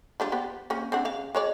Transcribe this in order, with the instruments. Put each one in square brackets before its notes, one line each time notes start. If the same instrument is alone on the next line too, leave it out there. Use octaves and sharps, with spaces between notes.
[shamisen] G3 D4 F4
B3 G4 C5
A#3 C4 C#4
C4 D4 F#5
C#3 F5
G#3 C#5 D5